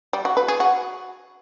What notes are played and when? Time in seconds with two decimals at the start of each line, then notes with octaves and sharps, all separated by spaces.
0.13 G3
0.25 F#4
0.37 B4
0.48 G#4
0.60 F#4